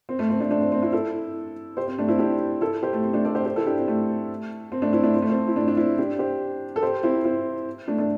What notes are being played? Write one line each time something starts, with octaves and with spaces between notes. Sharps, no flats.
C4
A3
C4
A3 D4
A3 D4
C4
C4
C4 E4
E4 A4
G4 C5
C4
A3 D4
C4 E4
D4 G4
E4 A4
G4 C5
A3
C4
A3 D4
A4 D5
G4 C5
G4 C5
E4 A4
D4 G4
C4
A3
C4
A3 D4
C4 E4
A3 D4
C4
A3
C4
E4
A3 D4
D4
C4 E4
D4 G4
G4 C5
A4
G4 C5
C4 E4
C4 E4
A3 D4
A3 D4